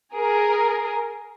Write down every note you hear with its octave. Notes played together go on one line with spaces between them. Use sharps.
G#4 A#4